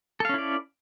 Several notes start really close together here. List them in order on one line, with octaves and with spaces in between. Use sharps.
A4 F5 C#4 E4 D5